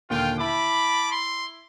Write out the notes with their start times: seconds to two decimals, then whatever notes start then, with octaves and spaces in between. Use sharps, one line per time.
0.10 D#2 A#2 D3 F4 F5 G5
0.39 E4 A5 B5 D6
1.12 C6